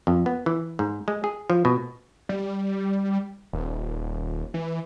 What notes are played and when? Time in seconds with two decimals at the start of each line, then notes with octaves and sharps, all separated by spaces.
0.07 F2
0.26 B3
0.46 E3
0.79 G#2
1.08 G#3
1.24 G#4
1.50 F3
1.65 B2
2.29 G3
3.53 D#1
4.54 E3